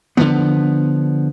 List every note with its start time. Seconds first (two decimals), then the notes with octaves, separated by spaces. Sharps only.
0.17 D3 D#3 F3 B3